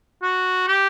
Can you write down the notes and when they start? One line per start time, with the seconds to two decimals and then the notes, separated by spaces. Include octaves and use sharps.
0.22 F#4
0.68 G4